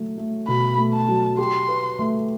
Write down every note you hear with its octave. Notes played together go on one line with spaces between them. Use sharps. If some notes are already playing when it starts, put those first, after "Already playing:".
Already playing: F#3 A3
A3
B2 B5
A3
A5
F#3
G4 C6
B4
A3